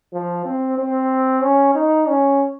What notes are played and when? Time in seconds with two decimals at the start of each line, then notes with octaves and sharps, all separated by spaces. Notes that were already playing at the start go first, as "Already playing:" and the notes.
0.13 F3
0.45 C4
0.78 C4
1.43 C#4
1.75 D#4
2.08 C#4